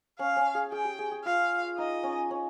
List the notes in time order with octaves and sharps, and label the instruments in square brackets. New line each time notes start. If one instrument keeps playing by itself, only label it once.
[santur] C#4 [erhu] F5
[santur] C#4
G#4
[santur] G#4 [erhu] G5
[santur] G4
G#4
G#4
[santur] F4 [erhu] F5
[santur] D#4 [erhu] D#5
[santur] C#4
C#4